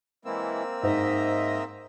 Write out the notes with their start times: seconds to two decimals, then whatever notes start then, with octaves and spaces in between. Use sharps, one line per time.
0.25 E3 G#3 A#3 C4 E4 E6
0.83 G#2 C5 D#5 E5 A#5